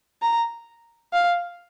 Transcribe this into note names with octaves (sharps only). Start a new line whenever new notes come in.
A#5
F5